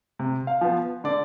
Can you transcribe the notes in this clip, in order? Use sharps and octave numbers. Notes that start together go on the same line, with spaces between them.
C3
F5
F3 B3
D3 D5